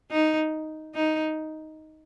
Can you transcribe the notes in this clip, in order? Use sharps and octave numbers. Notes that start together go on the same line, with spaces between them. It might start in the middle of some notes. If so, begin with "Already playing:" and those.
D#4
D#4